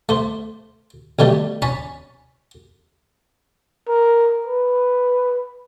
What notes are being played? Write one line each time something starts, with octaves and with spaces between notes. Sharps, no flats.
A3 C5
B1 D#3 G3 A3
C#4 A5 B5
A#4
B4